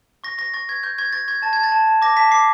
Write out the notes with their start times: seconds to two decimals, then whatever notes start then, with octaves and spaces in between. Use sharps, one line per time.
0.24 C#6 A#6
0.38 C#6 A#6
0.54 C#6 A6
0.69 C#6 G#6
0.83 C#6 G6
0.98 C#6 G#6
1.13 C#6 A6
1.28 C#6 G#6
1.42 A5 A6
1.53 A5 G#6
1.63 A6
1.72 A5
1.87 A5
2.02 D6 A#6
2.17 A5 B6
2.31 D6 C7